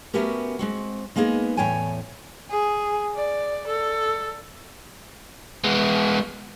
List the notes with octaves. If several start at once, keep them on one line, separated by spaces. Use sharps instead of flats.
A3 B3 C#4 F#4 G4 A#4
G#3 C4 F#4
G#3 A#3 B3 D#4 G#4
E2 A2 C#5 G5 G#5
G#4
D5
A4
G#3 B3